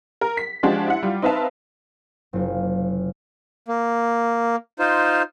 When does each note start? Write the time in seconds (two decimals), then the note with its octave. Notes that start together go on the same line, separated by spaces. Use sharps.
0.21 A#4
0.37 B6
0.63 F3 G#3 D4 F#4 G4
0.88 E4 F#5
1.03 G3 F4
1.22 C4 D#4 B4 E5 F5 A5
2.33 F#1 C3 F4
3.68 A#3
4.79 D#4 F4 C5